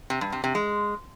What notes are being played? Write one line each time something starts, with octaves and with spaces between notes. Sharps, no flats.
C3
G2
C3
C3
G#3